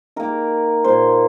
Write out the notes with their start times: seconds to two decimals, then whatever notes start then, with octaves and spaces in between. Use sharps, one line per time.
0.16 D#3 A#3 A#4
0.84 A#2 A#3 C5